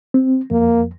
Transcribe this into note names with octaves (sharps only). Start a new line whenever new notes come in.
C4
F2 A#3